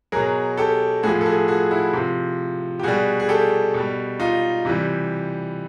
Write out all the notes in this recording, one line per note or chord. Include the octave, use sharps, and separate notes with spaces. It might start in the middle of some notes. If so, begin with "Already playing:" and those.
B2 F#3 G#4 A#4
G4 A4
A2 F3 F#4 G#4
A4
F#4 G#4
F#4 G#4
E4 F#4
C3 F3
G4
B2 G3 F#4 G#4
G#4
G4 A4
B2 G3
D#4 F4
C3 E3 G3